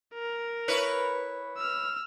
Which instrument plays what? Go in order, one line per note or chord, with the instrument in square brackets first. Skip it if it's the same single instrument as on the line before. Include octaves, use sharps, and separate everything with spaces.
[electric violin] A#4
[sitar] E4 B4 C#5
[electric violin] E6 F6